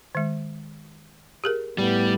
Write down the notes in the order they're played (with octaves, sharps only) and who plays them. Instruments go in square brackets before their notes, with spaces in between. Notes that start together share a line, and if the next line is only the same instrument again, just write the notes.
[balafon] D#3 G#3
G4 G#4 A#4
[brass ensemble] A2 B3 [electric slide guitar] G3